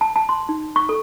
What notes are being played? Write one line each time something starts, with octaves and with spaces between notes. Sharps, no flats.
A5
A5
C6
D#4
C#6
A4